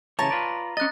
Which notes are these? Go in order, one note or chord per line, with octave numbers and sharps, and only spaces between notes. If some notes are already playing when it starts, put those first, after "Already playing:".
C#3 E3 C#5 A5 A#5 A#6
F4 B4 D5
C#4 D#5 F#6 A6